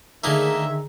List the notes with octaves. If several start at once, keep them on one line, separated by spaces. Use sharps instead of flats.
D3 D#3 A3 A#3 D#4 G#4 E5 A#5